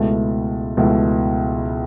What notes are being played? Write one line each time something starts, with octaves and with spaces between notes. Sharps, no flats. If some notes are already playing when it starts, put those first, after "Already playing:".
Already playing: C#2 B2 A3 E4
C#2 B2 A3 E4